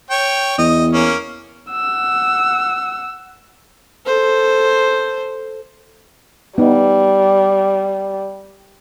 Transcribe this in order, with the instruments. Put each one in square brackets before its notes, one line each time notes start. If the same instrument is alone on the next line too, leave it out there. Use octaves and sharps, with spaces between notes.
[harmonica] C#5 G5
[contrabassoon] E2 [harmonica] D#5
[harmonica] A#3 C#4
[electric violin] F#5 E6
[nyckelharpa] A4 C5
[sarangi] G3 [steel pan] B3 D#4